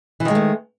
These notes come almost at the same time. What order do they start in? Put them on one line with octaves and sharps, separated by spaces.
E3 D#3 G#3 A3